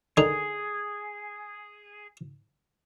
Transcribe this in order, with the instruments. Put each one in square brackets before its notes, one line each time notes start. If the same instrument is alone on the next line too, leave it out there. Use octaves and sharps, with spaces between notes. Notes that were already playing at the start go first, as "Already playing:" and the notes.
[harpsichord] D3 D#3 D#4 [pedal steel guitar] G#4